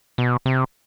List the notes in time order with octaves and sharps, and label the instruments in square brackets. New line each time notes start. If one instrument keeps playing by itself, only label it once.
[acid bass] B2
C3